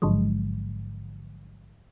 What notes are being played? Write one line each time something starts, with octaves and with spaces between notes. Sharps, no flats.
A1 G#2 D3 F3 F#3 G#3